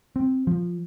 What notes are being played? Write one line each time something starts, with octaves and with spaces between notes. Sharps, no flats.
C4
F3